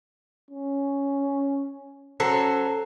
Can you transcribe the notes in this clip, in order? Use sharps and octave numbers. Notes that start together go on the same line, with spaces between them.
C#4
F#3 C#4 A4 C5